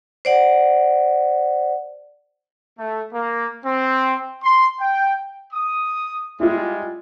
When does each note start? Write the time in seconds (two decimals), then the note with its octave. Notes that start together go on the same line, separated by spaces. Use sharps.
0.25 C5 D5 F#5
2.78 A3
3.12 A#3
3.65 C4
4.43 C6
4.81 G5
5.52 D#6
6.40 G3 G#3 E4 F4